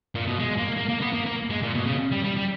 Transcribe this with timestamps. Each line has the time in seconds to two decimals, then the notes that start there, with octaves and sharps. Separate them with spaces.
0.15 A#2
0.27 B2
0.39 G#3
0.58 A#3
0.77 A#3
0.89 A#3
1.01 B3
1.13 A#3
1.26 A#3
1.50 G#3
1.62 A#2
1.75 B2
1.86 C#3
2.12 G3
2.24 G3
2.36 G3